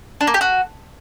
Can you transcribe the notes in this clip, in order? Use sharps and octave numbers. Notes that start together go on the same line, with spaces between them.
D4
A#3
G4
F#4